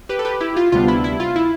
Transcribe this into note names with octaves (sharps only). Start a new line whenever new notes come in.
G4 B4
A4
G4 B4
E4 G4
F4
D2 C3 G3 B3 D4 F4
E4
E4
F4
E4